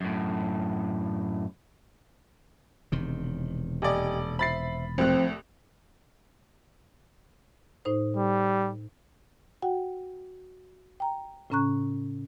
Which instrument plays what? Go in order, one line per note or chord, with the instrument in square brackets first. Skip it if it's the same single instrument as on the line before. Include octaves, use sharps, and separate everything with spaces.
[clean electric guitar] F#2 A2
[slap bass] E1 C3 D#3
[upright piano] D#1 D5 [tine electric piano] G4 D#5 G#5
[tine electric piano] C5 E5 [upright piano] B5 A6 C7
[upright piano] C2 A2 F#6 [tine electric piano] F3 [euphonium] C4
[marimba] A2 D#4 C5
[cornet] G3
[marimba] F#4 F#5 G5
G5 A#5
A2 C#3 C#4 A#5 C#6 F#6